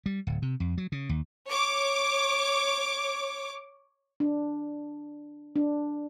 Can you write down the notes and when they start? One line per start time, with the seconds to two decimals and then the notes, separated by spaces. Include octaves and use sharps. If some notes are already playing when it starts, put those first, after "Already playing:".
0.06 G3
0.27 D1
0.42 C3
0.60 F2
0.78 F#3
0.92 C#3
1.09 D#2
1.49 C#5 D6
4.20 D4
5.56 D4